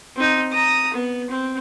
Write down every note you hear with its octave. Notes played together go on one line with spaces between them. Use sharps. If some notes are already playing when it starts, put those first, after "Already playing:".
C4 D#4
A#5 D#6
B3
C4